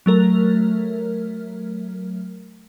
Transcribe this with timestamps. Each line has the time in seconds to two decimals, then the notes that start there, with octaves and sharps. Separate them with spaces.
0.06 F#3 A3 A#4